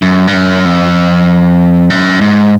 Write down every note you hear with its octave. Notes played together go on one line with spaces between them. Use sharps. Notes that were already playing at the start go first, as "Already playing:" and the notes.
F#2
G2
F#2
F2
F#2
G#2